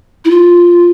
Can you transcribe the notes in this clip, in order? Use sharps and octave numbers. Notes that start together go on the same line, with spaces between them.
E4
F4